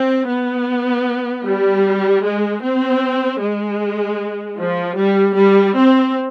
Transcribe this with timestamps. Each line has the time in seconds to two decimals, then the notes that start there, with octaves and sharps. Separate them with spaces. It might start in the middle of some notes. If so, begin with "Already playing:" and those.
Already playing: C4
0.26 B3
1.44 G3
2.23 G#3
2.62 C4
3.40 G#3
4.57 F3
4.95 G3
5.36 G3
5.75 C4